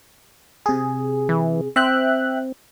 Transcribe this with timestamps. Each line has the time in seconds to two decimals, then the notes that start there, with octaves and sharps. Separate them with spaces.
0.66 C3 G#4
1.29 E3
1.76 C4 E5 G5 F#6